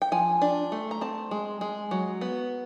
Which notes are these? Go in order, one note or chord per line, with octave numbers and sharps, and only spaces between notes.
G5
F3 G#5
D4
A3
A#5
C4 A5
G#3
G#3
F#3
B3